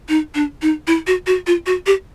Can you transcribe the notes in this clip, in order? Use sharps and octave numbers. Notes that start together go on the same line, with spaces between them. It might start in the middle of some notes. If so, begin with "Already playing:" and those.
D#4
D4
D#4
E4
F#4
F#4
F4
F#4
G4